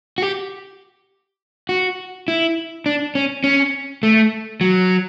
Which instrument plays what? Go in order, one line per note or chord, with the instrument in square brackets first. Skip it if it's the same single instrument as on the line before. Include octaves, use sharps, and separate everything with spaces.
[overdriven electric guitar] F#4
G4
F#4
E4
D4
C#4
C#4
A3
F#3